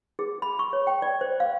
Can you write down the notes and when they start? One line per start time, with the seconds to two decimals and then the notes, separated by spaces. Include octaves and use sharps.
0.19 G#4
0.42 B5
0.59 C#6
0.73 C#5
0.87 G5
1.02 D5
1.21 C5
1.40 F5